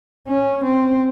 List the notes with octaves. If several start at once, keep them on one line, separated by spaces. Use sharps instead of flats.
C#4
C4